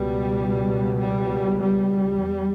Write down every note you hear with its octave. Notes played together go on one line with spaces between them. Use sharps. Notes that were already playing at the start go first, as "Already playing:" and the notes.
Already playing: C#2 B2 G3
G3
G3
E2